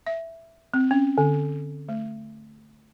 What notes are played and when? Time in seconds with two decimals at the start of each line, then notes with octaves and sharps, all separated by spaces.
0.07 E5
0.74 C4
0.91 C#4
1.18 D3
1.89 A3